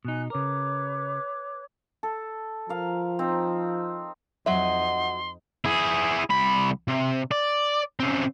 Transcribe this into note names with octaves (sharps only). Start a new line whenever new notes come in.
B2 D#4 G#5 F#6
C#3 A#4 B4 C#5 D6
A4
F3 A#4 F5
C4 D#4
F2 F#3 D#4 D#5 E5 F#5 C6
E4 G#4
C2 B5
C3
D5
C#3 C4